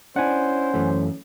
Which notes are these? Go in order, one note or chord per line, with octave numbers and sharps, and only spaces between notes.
C#4 D4 E4 C5 F#5 G#5
F#2 E3 A3